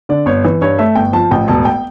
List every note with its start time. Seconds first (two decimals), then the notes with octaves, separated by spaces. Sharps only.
0.09 D3 D5
0.26 G1 C#5
0.45 E3
0.62 G2 C#5
0.78 A3 E5
0.95 G1 G5
1.13 F3 A5
1.31 A1 G5
1.48 E1 A5
1.65 G5